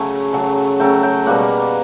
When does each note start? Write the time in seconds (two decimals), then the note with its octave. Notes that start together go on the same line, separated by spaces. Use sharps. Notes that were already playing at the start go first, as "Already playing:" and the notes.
Already playing: C#3 F#3 A3 G#5
0.33 C#3 F#3 A3
0.80 C#3 F#3 A3 G5
1.03 G5
1.26 B2 G3 A#3 F#5